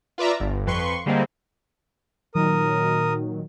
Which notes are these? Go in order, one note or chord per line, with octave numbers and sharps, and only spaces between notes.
F4 B4 D5 E5 A#5
G1
F2 B4 C6 C#6
D3 G3 G#3 A#3 C4
A#2 D#3 F#3 A#4 D#6